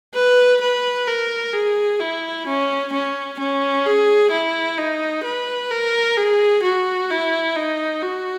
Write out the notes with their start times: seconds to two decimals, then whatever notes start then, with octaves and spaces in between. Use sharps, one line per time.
0.14 B4
0.61 B4
1.07 A#4
1.53 G#4
2.00 E4
2.47 C#4
2.92 C#4
3.39 C#4
3.86 G#4
4.31 E4
4.78 D#4
5.24 B4
5.71 A#4
6.17 G#4
6.63 F#4
7.10 E4
7.56 D#4
8.02 F#4